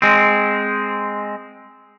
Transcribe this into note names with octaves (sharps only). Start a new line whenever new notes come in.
G#3 C4